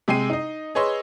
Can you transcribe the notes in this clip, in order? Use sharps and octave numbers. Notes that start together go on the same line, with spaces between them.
C3 G#3 G#4 G5 C7 D#7
D#4 D#5
G#4 B4 C#5 D#5 C6 E6